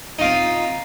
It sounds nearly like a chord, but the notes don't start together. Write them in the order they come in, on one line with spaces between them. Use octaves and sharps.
D#4 F4 C4